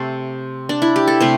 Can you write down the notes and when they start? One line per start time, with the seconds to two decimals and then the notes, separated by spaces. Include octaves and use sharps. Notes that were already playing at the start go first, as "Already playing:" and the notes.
Already playing: C3 A3 A4 C5
0.69 D4
0.82 E4
0.96 G4
1.07 A4
1.21 C3 A3 C5